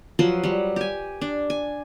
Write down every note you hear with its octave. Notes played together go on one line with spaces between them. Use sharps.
F3 F#3 B4 C6
F#3 G3
G4 G#5
D4
G#5